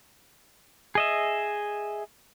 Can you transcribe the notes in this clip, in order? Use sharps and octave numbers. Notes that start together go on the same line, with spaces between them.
G#4 D#5 E5